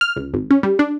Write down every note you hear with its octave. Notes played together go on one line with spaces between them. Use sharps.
F6
C#2
G#1
C#4
G3
D4